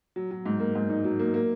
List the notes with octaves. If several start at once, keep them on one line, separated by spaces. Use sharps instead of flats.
F#3
F#3
G#2
A#3
G#2
D#4
F#3
A#3
A#3